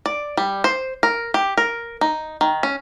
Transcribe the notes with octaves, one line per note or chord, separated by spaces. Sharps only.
D5
G3
C5
A#4
G4
A#4
D#4
D#3
C#4